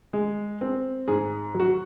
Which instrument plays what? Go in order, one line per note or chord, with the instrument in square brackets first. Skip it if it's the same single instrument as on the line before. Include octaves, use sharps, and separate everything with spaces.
[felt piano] G#3
C4
G#2 G#4
F#3
F#4